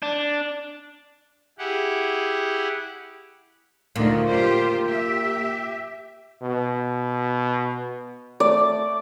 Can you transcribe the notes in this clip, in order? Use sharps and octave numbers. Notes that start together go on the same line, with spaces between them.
D4
E4 G4 G#4 F#5
D2 A#2 D3 D#3
F4 G4 C5
G4 E5
B2
A3 D5